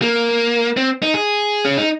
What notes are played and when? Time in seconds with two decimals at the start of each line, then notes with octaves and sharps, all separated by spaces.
0.02 A#3
0.77 C4
1.02 D#4
1.14 G#4
1.65 C#4
1.77 D#4